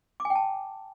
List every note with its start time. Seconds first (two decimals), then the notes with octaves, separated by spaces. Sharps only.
0.20 D6
0.25 G#5
0.30 G5
0.35 A5